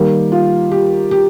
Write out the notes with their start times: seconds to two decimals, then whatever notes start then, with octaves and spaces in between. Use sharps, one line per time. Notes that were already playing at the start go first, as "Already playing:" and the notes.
Already playing: D#3 G3 A#3 G4
0.32 F4
0.71 G4
1.11 G4